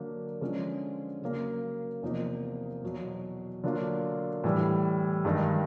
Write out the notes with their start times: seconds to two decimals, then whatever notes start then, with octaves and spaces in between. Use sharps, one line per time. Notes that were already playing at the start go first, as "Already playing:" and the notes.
Already playing: D3 F#3 A#3 D4
0.41 D3 F3 G#3 C#4
1.22 C#3 F#3 A#3
2.02 E2 C3 F3 A#3 D#4
2.83 E2 B2 F#3
3.64 D3 F#3 A#3 D4 F4
4.44 A2 E3 G3
5.25 G2 D#3 G#3